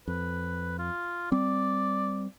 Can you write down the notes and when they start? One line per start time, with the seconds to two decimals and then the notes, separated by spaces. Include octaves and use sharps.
0.08 F2 B4
0.79 F4
1.32 G3 C4 D5